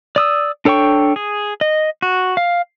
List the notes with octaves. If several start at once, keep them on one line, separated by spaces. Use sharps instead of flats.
D5 D#6 E6
D4 A4 C#5 G5 C#6
G#4
D#5
F#4
F5